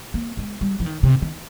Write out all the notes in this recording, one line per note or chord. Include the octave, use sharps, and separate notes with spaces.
A#3
G#3
G3
F3
D#3
C3
D#3